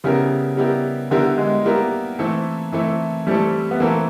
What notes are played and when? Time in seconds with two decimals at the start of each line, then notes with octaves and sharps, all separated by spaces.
0.04 C#3 G3 B3 E4 G4 A#4
0.57 G3 B3 E4 G4 A#4
1.11 D3 G3 B3 E4 G4 A#4
1.38 G#3
1.64 G3 A#3 B3 E4 G4 A#4
2.19 E3 A3 C4 E4 A4
2.72 E3 A3 C4 E4 A4
3.27 E3 G3 A3 C4 E4 A4
3.71 B3
3.80 E3 A3 A#3 C4 E4 A4